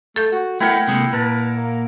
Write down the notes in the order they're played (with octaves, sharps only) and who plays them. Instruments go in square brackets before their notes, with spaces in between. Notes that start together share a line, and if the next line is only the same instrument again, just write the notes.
[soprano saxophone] A3 [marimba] A4 G6
[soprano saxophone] F#4
[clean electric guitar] A3 B3 [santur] E4 A#4 F#5 [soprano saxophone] G5
[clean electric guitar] C3 G#3 A#3
[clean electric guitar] A#2 [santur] A#4 A5 [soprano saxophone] B4
[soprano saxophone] A#3